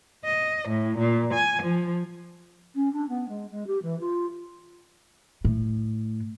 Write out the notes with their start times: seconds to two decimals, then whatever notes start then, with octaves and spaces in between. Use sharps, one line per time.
0.24 D#5
0.67 A2
0.97 A#2
1.33 G#5
1.62 F3
2.75 C#4
2.93 D4
3.09 B3
3.28 G#3
3.51 G#3
3.67 G4
3.82 E3
4.00 F4
5.45 A2